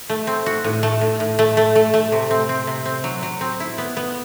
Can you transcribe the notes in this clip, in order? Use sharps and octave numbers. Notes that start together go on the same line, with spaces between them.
A3
C4
F#4
A2
A3
A2
A2
A3
A3
A3
A3
C3
C4
C4
C3
C4
F#3
F#3
C4
E4
B3
B3